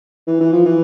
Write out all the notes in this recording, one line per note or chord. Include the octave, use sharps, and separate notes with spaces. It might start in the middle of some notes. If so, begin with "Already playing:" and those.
E3
E3
F3
E3